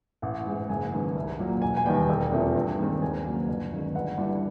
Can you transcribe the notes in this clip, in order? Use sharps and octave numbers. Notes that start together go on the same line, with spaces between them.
A1 F#5
G#2 E3 G#3
F#1 G#5
F#2 D#3 G#3 B3
C2
A#2 F#3 A#3
E1 G#5
G#5
D#2 D#3 G3 B3 G5
E1
E2 C3 F3 A3
G2
D#3 G#3 C4
D#2 G#5
C#3 F#3 A#3
G1
F#2 D#3 G#3
G1 F#5
G2 E3 G3